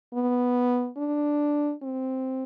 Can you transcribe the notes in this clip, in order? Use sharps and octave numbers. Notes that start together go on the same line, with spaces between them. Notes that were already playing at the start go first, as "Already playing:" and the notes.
B3
D4
C4